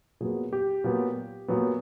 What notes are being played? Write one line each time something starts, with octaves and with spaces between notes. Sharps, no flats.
A#2 F#3 B3 G#4
G4
A#2 F#3 B3
A#2 F#3 B3